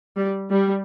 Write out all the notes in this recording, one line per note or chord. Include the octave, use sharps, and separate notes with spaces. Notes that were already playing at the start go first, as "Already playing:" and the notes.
G3
G3